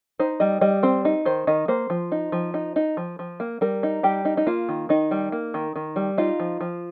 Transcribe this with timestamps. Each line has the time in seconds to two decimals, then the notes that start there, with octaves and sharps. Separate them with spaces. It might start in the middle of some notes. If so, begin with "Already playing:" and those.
0.19 D#4 C5
0.40 G3 D#5
0.61 G3 D#5
0.83 C4 C5
1.05 D#4
1.25 D#3 C5
1.47 D#3 D#5
1.68 A#3 C5
1.90 F3
2.12 D#4
2.32 F3
2.54 D#4
2.76 D#4
2.97 F3
3.19 F3
3.40 A#3
3.61 G3 A#4
3.83 D#4
4.03 G3 G4
4.25 D#4
4.37 D#4
4.47 A#3 F4
4.69 D#3
4.89 D#3 D#4
5.11 G3
5.32 A#3
5.54 D#3
5.76 D#3
5.96 G3
6.18 D#4 F4
6.40 F3
6.61 F3